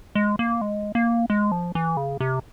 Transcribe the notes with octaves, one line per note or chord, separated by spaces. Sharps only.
G#3
A#3
G#3
A#3
G#3
F3
E3
C#3
C3